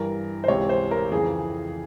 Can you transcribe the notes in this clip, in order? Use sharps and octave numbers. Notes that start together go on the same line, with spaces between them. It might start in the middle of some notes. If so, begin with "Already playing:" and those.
Already playing: G2 E3 A#4
C5
C#2 C3 E3 C#5
C5
A#4
F2 C#3 E3 G#4